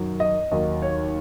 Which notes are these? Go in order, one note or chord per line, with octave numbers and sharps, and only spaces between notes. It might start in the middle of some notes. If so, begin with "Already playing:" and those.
Already playing: F#2 D#3 F#3
D#5
D#2 D#3 F#3 D#5
C#5